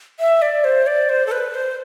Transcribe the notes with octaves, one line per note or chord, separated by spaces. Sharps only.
E5
D5
C5
D5
C5
A4
B4
C5